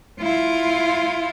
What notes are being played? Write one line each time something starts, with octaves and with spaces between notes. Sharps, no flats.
E4 F4